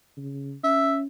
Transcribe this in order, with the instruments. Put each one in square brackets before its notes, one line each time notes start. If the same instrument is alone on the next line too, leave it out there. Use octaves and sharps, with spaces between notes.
[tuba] C#3
[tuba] C#4 [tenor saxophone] E5